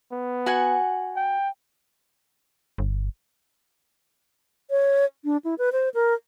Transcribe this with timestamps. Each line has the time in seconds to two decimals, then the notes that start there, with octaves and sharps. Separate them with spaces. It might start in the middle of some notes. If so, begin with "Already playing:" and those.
0.11 B3
0.46 F#4 F#5 G#5
1.16 G5
2.78 G1
4.70 C#5
5.25 D4
5.45 E4
5.58 B4
5.72 C5
5.94 A#4